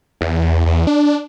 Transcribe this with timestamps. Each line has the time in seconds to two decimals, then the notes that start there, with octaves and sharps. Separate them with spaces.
0.21 E2
0.66 E2
0.87 D4